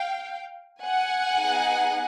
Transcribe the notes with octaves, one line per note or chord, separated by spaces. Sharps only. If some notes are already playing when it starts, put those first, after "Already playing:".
Already playing: F5 G5
F#5 G#5
B3 D#4 G#4